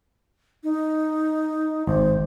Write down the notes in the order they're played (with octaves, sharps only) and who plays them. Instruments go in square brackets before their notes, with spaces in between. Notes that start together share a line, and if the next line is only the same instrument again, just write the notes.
[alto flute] D#4
[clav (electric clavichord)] G#1 [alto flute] C5